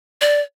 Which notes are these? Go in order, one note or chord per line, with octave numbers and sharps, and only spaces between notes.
D5